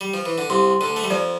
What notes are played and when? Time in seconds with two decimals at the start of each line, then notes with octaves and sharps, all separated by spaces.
0.01 G3
0.14 F3
0.26 E3
0.38 D3
0.50 C2 C3 C6
0.71 C6
0.81 D2 D3
0.90 A5
0.96 A3
1.04 G3
1.10 F2 F3 D5